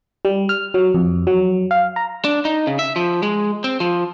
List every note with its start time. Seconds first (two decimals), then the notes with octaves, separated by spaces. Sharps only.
0.25 G3
0.49 F6
0.74 F#3
0.95 F2
1.27 F#3
1.71 F5
1.96 A#5
2.25 D4
2.45 D#4
2.67 C#3
2.79 E5
2.96 F3
3.23 G#3
3.64 C4
3.80 F3